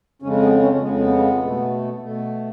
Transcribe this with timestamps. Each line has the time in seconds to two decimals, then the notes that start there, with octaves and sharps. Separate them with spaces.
0.22 F2 C#3 G#3 C#4
0.42 B3
0.62 C#4
0.82 F2 C#3 G#3 B3
0.96 B3
1.42 B2 A3
2.01 B2 A3